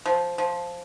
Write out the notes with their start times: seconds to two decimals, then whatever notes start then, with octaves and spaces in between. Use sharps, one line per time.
0.06 F3
0.38 F3